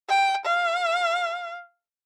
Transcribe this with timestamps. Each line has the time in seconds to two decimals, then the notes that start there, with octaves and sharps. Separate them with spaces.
0.09 G5
0.46 F5